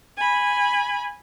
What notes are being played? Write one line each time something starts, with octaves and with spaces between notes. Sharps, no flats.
G#5 B5